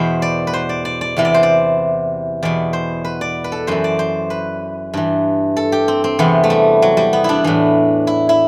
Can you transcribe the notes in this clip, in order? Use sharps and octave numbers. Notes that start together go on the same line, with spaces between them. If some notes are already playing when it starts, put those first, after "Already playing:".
Already playing: E2 B2 C5
D5
B4
C5
D5
D5
D5
E2 C3 E3
D5
C5
D5
E2 B2 D5
C5
B4
D5
B4
A4
F#2 E3 C5
D5
C5
B4
G2 E3
A4
G4
C4
C4
E2 C3 E3 B3
A3
G3
F#3
G3
B3
D4 E4
A2 E3
E4
E4